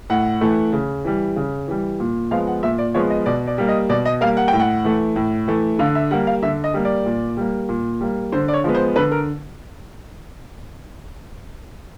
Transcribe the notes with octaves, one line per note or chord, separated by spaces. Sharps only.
A2 F#5
E3 A3
C#3
E3 G3
C#3
E3 G3
A#2
F3 G#3 B3 F5
F#5
A#2 E5
D5
F3 G#3 B3 C#5
D#5
B2 D5
D5
G3 A#3
D#5
B2 D5
D#5
G3 A#3 F5
F#5
G5
A2
F#5
E3 A3
A2
E3 A3
D3 F5
E5
G3 A#3 F#5
F5
D3 E5
D#5
G3 A#3
D5
A#2
G3 A#3
A#2
G3 A#3
D3 C5
D5
C#5
F3 G#3 B3
C5
D3 B4
A#4